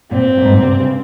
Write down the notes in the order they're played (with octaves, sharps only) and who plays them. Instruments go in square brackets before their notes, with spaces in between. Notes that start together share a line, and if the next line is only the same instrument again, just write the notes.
[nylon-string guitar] A#2 [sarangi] C4
[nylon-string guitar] A#2
G#2
A#2
C3
C#3